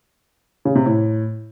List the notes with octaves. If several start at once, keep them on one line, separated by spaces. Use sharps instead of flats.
C#3
C3
A2